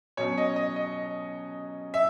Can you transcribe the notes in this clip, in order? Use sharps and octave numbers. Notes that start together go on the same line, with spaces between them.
B2 F#3 C#4 C#5
D#5
D#5
D#5
E5